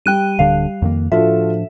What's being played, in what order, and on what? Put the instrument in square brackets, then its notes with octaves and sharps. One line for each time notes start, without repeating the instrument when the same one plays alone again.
[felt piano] G3 [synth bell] G5 F#6 D#7
[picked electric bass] D1 D3 D4 [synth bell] F5
[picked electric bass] F2 D#3 A#3
[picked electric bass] A2 F3 D4 [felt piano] F4 F#4 A4 [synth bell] E5